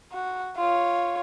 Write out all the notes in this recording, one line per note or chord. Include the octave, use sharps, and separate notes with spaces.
F#4
F4 C#5